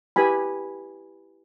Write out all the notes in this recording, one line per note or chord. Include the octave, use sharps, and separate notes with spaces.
E4 G4 B4 G#5 B5